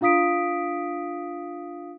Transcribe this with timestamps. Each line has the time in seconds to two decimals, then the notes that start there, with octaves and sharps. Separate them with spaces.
0.01 D4 F4 F5 D#6 B6 D7